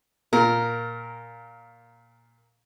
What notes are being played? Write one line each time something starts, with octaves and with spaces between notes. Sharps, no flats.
A#2 A#4